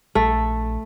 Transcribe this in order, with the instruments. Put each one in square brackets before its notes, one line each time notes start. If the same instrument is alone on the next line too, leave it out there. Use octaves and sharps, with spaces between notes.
[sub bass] A#1 [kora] A3